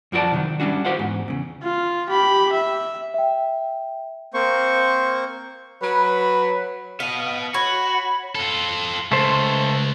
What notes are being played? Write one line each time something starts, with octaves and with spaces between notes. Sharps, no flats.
F#2 F3 F#4 A4 D5 A5
C3 D#3 F#3
G3 C#4 D4 F#4
F#4 G4 C5 F5 F#5
E2 G#2
E2 C#3
F4
G4 B5
E5
E5 G5
A#3 C4 C5 C#6
F#3 B4
B3 D#5 F5
F#4 C#5 B5
F4 A4
C#2 A3 C5